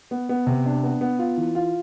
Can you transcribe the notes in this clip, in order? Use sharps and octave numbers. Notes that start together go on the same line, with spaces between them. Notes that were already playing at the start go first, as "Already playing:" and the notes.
B3
B3
C3
D4
B3
B3
F4
E3
F4